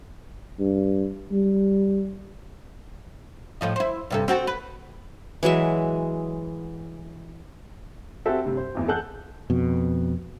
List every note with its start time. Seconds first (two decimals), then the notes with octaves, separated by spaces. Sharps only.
0.59 G2
1.32 G3
3.61 A2 F3 D#4
3.76 E4 C5
4.10 G2 C3 A4
4.28 C4 F#4 A4
4.47 B4
5.43 E3 F#3 G#3 E5
8.26 C4 F#4 G4 A4 E5
8.45 G2 C3
8.57 C5
8.75 G#1 E2 E3
8.88 G#4 A4 F#5 A5 F#6 G6
9.50 F2 B2